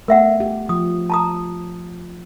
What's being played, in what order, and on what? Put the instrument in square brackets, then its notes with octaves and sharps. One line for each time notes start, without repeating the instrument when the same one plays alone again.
[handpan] A3 B3 [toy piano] A#4 E5 F#5
[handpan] G4
[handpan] F3 [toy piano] D#6
[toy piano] A5 A#5 D#6